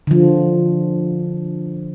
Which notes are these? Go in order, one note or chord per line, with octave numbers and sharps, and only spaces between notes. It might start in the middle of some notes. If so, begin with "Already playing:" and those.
D3 F3